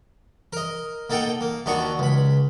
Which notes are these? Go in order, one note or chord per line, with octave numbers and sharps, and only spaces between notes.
A#4 D#5
A#3 D#4 A4 F#5 G5
A#3
D#2 D4 D#4 F#4 C#6
C#2 B5